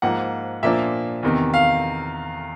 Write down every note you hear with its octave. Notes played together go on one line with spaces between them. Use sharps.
G#2 F3 A#3 F#5
A#2 F3 A#3 D4 E5
E2 C3 D#3
F5